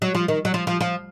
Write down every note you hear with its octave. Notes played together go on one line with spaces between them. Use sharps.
F#3
F3
D#3
F#3
F3
F3
F3